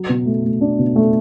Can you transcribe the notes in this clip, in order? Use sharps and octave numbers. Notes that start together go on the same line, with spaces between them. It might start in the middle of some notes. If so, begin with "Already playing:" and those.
Already playing: F#3
B2
A3
A3
D4
B2
A3